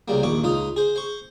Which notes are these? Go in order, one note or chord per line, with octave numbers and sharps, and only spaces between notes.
C2 C#3 G3 A#3
A#1 D#2 C#6 D6
C#2 D#4 F4 D#6
G#4 C5
C5 C#6